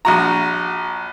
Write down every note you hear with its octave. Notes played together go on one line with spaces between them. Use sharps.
A#1 F#4 A#5